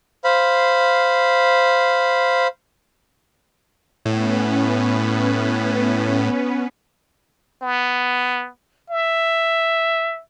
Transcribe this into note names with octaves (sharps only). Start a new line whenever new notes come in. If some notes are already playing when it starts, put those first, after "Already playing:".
C5 F5 B5
A2 B3 C#4 B4
B3
E5